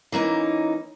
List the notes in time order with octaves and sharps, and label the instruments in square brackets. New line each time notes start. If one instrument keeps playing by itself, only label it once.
[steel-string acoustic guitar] E3 A#3 C#4 D#4